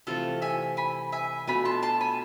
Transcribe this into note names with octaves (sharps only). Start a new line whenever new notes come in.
C3 E3 A3 F4 A4
E5 G#5
G#5 B5
E5 G#5
B2 A3 D4 F4 G#5 B5
A5 C6
A5 C6
G#5 B5